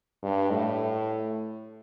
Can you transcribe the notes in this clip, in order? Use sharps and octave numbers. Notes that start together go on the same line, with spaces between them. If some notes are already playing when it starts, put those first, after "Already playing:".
G2
A2